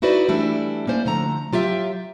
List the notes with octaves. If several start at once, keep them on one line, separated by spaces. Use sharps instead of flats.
D#4 E4 F#4 B4 C5 D5
E3 G3 A3 D4 E4
A#3 C#4 C5 D5
D3 F3 A3 A#5
F#3 F4 G4 E5